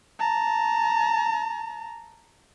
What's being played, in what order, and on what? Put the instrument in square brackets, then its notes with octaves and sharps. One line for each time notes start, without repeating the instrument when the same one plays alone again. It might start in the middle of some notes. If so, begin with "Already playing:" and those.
[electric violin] A5 A#5